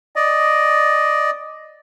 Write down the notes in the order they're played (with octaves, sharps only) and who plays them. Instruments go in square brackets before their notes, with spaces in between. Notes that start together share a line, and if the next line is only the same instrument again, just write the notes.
[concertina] D5 D#5